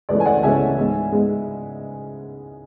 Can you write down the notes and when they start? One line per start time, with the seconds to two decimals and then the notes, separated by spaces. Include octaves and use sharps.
0.09 C#2 C#3 E3 A3 C#4 B4 D5
0.20 G#5
0.26 D5 F#5
0.43 C#2 C#3 E3 A3 C#4 E5 G#5
0.78 G#2 G#3 B3
1.12 G#2 G#3 B3